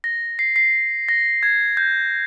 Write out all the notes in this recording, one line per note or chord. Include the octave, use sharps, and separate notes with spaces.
A#6
C7
C7
A#6
G#6
G6